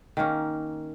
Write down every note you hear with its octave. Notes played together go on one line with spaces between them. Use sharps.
D#3 A#3 C#4